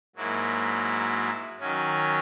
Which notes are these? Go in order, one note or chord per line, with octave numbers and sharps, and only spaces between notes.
G#2 F#3 A#3 E4
D#3 F#3 C#4